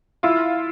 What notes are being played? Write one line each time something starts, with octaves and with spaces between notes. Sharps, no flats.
E4 F4